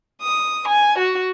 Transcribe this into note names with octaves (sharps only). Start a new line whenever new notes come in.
D#6
G#5
F#4